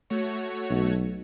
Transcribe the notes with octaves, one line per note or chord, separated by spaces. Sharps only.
A3 F#4 C#5
B1